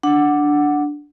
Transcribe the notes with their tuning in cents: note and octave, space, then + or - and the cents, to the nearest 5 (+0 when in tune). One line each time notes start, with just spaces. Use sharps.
D4 +0 F#5 +0